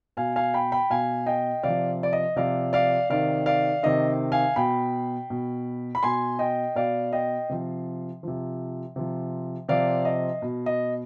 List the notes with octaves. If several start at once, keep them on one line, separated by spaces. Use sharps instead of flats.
B2 F5 G#5
F5 G#5
G5 B5
G5 B5
B2 F5 G#5
D#5 G5
C3 F3 D5 F5
D5
D#5
C3 F3 D5 F5
D5 F5
C3 D#3 D5 F5
D5 F5
C3 D#3 D#5
F5 G#5
B2 G5 B5
B2
B5
B2 G#5 C6
D#5 G5
B2 D5 F5
D#5 G5
C3 F3
C3 F3
C3 F3
C3 F3 D5 F5
D#5
B2
D#5